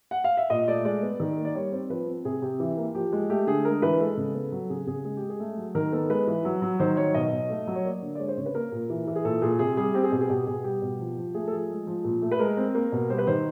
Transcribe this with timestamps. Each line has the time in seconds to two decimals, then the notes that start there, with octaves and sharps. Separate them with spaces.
0.11 F#5
0.24 F5
0.37 E5
0.50 A#2 D#5
0.68 A3 D5
0.85 G#3 D5
1.03 B3
1.20 D#3
1.38 A#3
1.45 D5
1.55 G3 C#5
1.72 C4 C5
1.90 F3 B4
2.07 C4
2.25 C3 G#4
2.42 C3 G4
2.60 E3
2.77 A#3
2.95 F3 G4
3.12 G#3
3.30 A3 G4
3.47 D3 G#4
3.65 G#3 A#4
3.82 E3 B4
4.00 G#3 A4
4.17 C#3
4.35 B3
4.52 F#3
4.70 C#3 G#4
4.87 C#3 G#4
5.05 G#3 G#4
5.17 G#3 G4
5.30 G#4
5.40 A3
5.57 F#3
5.75 D#3 A#4
5.92 B3 A4
6.10 G#3 B4
6.27 E3
6.45 F#3
6.62 F#3
6.80 D#3 C5
6.97 F#3 C#5
7.14 B2 D#5
7.32 B2
7.50 A3
7.67 F#3
7.75 C#5
7.84 A#3 D5
8.02 D3
8.15 D5
8.20 G#3 C#5
8.28 C5
8.37 C#3 C#5
8.46 B4
8.55 A#3 A#4
8.72 A#2
8.90 E3
9.07 E3
9.16 G#4
9.25 A#2 A4
9.42 A#2 G#4
9.59 C3 G#4
9.77 G3 G#4
9.94 C4 G4
10.04 G#4
10.12 B2 G4
10.21 G#4
10.29 B2 G4
10.47 B2 G#4
10.64 G3 G4
10.82 B2
10.99 F3
11.17 F3
11.34 A3 G#4
11.48 A4
11.52 F3 G#4
11.70 G#3
11.87 F3
12.04 A#2
12.22 A3
12.31 B4
12.39 G#3 A#4
12.57 C4
12.75 A#3
12.92 B2
13.10 G3 C5
13.18 B4
13.27 D#3 C5